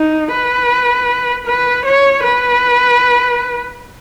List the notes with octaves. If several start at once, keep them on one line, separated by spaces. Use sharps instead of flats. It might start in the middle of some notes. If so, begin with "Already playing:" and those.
Already playing: D#4
B4
B4
C#5
B4